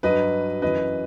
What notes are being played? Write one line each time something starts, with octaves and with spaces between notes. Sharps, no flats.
G2 F#3 B4 D#5
F#2 E3 B4 D#5